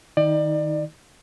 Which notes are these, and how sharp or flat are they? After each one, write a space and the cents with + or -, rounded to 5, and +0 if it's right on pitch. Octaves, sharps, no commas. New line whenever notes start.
D#3 +0 D#4 +25 D5 +30